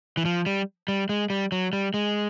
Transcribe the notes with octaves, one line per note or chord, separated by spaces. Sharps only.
E3
F3
G3
G3
G#3
G3
F#3
G3
G#3